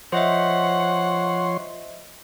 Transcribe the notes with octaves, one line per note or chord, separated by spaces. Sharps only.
F3 C5 C#5 D#5 E5 F#5 C6